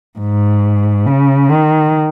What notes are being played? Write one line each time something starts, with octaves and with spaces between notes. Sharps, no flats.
G#2
C#3
D#3